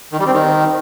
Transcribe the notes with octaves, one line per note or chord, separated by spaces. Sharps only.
D#3
G3
C4
D#3